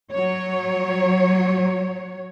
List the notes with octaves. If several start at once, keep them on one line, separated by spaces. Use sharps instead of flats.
F#3 C#5